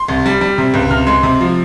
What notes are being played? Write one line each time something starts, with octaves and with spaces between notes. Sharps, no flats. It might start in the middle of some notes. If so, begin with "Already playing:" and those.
Already playing: C6
C2
G3
G3
C3
C#2
C3 F6
G#3
C3
F3